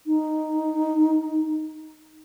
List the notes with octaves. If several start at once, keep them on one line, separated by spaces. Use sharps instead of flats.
D#4